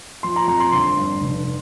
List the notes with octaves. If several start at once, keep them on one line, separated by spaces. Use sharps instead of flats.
F3 C6
A#5
F2 A#5
C6
G1 C6
G2
F1